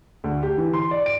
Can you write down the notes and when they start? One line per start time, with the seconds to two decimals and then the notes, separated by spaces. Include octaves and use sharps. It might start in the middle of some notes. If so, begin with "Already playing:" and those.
0.24 D2
0.43 G4
0.58 E3
0.73 C6
0.91 D5
1.06 D7